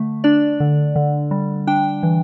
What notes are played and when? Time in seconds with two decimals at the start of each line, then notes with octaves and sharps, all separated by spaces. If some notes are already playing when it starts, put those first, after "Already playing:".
Already playing: D3 A3
0.24 D4 D5
0.60 D3
0.96 D3
1.31 G3
1.67 D4 G5
2.03 E3